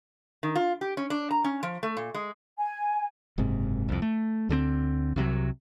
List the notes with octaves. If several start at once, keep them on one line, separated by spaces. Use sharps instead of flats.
D#3
F4
G4
C#4
D4
A#5
C#4
F3
A3
A#2
G#3
G#5
F#1 G#2 C3
C2 F2
A3
D2 D3 F3 C4
C2 C3 F3 F#3